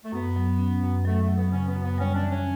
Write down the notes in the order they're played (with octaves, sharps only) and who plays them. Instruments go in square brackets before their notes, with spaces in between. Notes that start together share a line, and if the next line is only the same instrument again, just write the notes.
[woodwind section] A3
[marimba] F#2 [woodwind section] B3
[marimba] F#3
C#4
F#2
[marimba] F#3 [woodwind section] A3
[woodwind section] A3
[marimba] F#3
[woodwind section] B3
[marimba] C#3 [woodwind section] C#4
[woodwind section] B3
[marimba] F#2
[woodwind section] B3
[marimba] G3 [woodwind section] C#4
[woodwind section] D4
[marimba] E3
[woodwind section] C#4